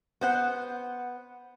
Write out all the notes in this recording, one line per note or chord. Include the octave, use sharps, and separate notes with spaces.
B3 C5 F#5